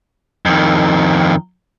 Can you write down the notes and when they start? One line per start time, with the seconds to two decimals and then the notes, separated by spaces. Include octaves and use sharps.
0.46 F2 D#3